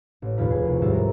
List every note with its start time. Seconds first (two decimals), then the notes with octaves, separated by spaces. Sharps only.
0.22 A1
0.37 F1 D#2 B2 F4 B5
0.51 D#3 G#4
0.65 C2
0.82 D#2 G#2 G3 E5 A6
0.93 A#4